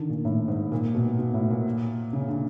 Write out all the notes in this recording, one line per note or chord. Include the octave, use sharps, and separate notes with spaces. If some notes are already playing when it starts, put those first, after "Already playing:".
Already playing: D3 D#3
A#2
A2
G#2
A#2
B2
B2
A2
A#2
C#3
D3